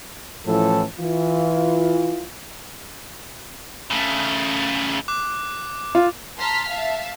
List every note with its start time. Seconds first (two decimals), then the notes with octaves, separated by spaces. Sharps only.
0.46 A2 E3 F3 C#4 A4
0.99 E3 F4
3.91 C#3 A3
5.08 D6 F#6
5.95 F4
6.38 A5 A#5 C6 F6 B6
6.68 E5 F5 A5